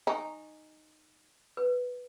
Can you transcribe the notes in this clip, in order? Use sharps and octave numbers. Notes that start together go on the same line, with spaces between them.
D#4 G#5 C#6
B4